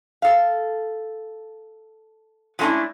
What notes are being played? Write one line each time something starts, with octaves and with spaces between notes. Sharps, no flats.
A4 F5
F#3 G#3 A3 C#4 D4 E4